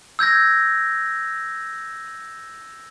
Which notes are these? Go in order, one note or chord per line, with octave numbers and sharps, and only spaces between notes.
E6 G6 G#6 A#6